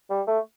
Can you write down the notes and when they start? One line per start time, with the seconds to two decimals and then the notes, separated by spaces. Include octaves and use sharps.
0.10 G3
0.27 A3